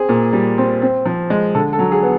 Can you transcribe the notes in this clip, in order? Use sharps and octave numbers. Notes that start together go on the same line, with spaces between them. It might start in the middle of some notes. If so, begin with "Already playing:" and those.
Already playing: C4 G#4
A#2
G3
C4
C4
F3
G#3
D3 A4
A4
F#3
G#4
B3